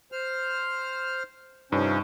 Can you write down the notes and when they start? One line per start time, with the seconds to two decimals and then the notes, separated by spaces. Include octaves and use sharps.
0.12 C5 F6
1.72 G2 C3 F3 C#4 D#4